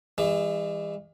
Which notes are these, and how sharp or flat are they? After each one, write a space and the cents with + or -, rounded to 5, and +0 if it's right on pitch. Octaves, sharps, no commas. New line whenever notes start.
E3 +0 G#3 -45